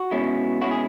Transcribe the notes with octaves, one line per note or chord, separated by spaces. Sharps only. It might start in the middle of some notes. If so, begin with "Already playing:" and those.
Already playing: F#4
B2 G#3 C#4 E4
B2 G#3 C#4 E4 F#4
G#4